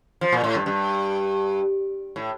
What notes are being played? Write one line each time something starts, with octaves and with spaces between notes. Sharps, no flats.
F3
A#2
A2
G2
G2
A2